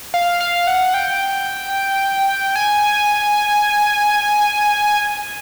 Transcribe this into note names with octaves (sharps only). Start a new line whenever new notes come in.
F5
F5
F#5
G5
G#5